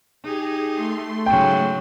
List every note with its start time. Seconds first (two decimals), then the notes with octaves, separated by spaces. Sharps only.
0.24 D#4 G4 G#4
0.75 A3 C6
1.26 G#2 C#3 F#3 G5